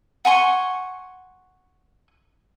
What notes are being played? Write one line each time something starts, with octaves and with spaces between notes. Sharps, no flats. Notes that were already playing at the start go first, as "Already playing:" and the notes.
F#5 G#5 C6 C#6